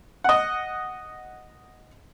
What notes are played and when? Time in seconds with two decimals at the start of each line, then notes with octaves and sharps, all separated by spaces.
0.24 D#5 F#5